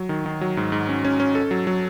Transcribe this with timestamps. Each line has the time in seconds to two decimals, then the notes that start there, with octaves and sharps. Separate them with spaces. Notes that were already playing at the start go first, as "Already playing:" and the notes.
Already playing: F#3
0.09 D#3
0.26 D#3
0.41 F#3
0.57 G#2
0.72 G#2
0.89 C#4
1.05 C#4
1.20 C#4
1.35 A4
1.51 F#3
1.67 F#3